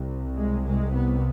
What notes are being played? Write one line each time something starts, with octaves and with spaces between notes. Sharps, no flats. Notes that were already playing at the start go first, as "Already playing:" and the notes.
Already playing: C2 C3
G#3
G#3
B3